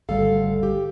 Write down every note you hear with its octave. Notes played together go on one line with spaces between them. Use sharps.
G#1 D2 G3 A4 F5
G4